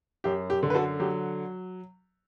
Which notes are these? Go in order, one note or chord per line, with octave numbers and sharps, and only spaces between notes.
F#2 G4
G4
D3
B4
F#4 A4
F#3 G4